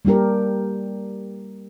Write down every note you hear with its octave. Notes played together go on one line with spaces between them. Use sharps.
G3 A#3 D4 G4 A#4